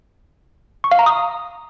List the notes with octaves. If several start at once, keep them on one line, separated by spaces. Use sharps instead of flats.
C#6
F5
A#5
D#6